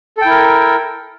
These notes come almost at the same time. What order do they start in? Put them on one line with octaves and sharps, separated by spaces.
A4 G5 E4 A#4